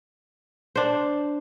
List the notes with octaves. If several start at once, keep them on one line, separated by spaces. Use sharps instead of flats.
D4 C5